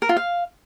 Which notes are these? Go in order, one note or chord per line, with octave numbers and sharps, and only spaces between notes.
A#4
F4
F5